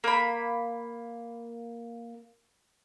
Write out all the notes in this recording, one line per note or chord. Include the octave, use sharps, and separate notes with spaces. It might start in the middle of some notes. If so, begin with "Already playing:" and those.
A#3 B5